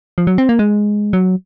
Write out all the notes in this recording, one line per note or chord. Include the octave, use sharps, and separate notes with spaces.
F3
F#3
C4
A#3
G#3
F#3